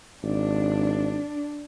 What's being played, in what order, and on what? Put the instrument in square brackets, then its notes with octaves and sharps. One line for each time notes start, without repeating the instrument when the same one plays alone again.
[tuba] G#1 [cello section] D4